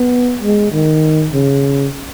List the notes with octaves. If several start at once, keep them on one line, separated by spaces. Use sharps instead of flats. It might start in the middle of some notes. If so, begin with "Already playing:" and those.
Already playing: B3
G#3
D#3
C#3